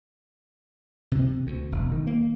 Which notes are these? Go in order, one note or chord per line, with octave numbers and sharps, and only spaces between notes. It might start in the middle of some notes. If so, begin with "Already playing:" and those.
C3
D2
E1
D#3
A#3